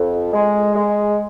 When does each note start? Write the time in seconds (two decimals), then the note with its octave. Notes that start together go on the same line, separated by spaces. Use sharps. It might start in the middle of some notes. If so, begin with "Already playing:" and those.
Already playing: F2
0.33 G#3
0.75 G#3